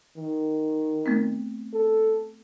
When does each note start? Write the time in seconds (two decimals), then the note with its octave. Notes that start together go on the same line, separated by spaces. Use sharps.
0.17 D#3
1.06 A3 B3 C4
1.74 A4